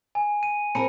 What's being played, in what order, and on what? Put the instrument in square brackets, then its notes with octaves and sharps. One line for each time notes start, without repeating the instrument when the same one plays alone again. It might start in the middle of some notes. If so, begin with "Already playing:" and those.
[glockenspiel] G#5
D#7
[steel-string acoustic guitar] C4 A#4 [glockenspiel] A5 B5 C#7